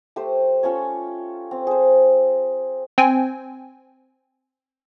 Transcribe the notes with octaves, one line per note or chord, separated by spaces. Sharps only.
A3 G4 C5
C#4 F4 A4 C#5
C4
G#4 C5
C4 G5 G#5